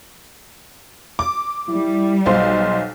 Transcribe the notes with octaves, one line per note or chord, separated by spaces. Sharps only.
D6
G3 E4
B1 C5 D#5 F5